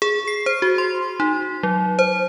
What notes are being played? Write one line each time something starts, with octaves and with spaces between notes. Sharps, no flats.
G#4
C7
C5
F#4
C6
D#4
F#3
C5